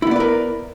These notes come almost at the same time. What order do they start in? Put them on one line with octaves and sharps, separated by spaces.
E4 B3 D5 B4 A#4